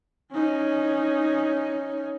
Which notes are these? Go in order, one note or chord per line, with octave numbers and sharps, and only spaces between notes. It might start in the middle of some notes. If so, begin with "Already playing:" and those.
C#4 D#4